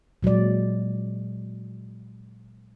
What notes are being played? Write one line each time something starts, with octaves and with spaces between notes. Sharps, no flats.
A#2 F#3 G#3 D5